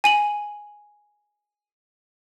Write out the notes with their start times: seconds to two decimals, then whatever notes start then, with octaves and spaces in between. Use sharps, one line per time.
0.04 G#5 D#7 F#7